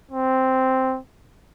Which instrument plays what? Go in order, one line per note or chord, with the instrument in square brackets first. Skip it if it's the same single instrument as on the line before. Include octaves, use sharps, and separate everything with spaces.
[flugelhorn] C4